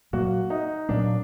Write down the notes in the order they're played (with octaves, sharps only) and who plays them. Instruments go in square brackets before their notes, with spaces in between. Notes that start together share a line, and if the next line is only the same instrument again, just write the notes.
[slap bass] A#2 F#3 A#3 [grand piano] F#4
[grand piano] D#4
[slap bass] A#2 F#3 A#3 [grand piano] D4